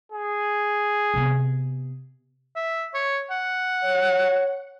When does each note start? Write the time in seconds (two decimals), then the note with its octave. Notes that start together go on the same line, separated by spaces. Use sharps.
0.12 G#4
1.14 C3 B3
2.56 E5
2.94 C#5
3.31 F#5
3.84 C#5